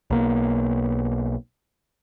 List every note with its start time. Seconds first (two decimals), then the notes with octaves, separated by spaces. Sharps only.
0.10 B1 A#3